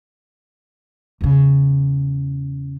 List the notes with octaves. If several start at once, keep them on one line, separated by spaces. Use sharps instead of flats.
E2 C#3